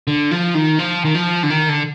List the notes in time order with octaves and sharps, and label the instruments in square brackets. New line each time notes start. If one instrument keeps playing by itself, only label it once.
[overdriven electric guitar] D3
F3
D#3
F3
D#3
F3
D3
D#3
D3